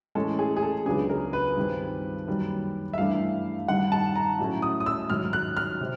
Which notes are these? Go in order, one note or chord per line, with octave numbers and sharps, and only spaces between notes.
A2 E3 G#3 C#4 A4
G#4
G#4
A4
C#2 C#3 F#3 B3 D4 G#4
A#4
B4
G2 D#3 G3 C4
F#2 D#3 G3 A#3
E5
G2 E3 A3 D4 F5
G2 D#3 G3 F#5
A5
A#5
A2 F#3 A3 C#4
D#6
D#6
E6
G#2 D#3 F#3 F6
F#6
F6
C3